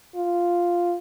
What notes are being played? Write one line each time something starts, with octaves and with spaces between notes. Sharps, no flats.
F4